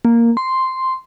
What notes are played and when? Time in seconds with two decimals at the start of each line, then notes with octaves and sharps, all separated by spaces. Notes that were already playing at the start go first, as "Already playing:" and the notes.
0.05 A#3
0.37 C6